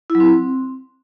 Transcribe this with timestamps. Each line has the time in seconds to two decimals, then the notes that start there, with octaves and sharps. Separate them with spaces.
0.10 E4
0.15 F#3
0.20 C4